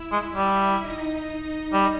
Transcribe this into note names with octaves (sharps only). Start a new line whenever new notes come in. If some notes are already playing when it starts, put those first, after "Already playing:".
Already playing: E4 E5
G#3
G3
D#4 D#5
D#4 D#5
G3